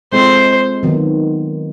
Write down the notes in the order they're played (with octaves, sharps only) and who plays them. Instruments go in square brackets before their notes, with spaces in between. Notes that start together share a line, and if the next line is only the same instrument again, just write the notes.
[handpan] G#3 C4 F4 A4 [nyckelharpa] C5
[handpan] D#3 F#3 B3